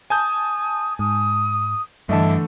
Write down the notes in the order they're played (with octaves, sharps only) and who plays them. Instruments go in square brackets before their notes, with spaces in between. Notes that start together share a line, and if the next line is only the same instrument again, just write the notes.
[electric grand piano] G#5 A5 G6 [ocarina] D#6
[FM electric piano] G#2 [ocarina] D#6
[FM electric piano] G2 D#5 A5 [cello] D3 E3 [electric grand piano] A3 A4 [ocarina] E5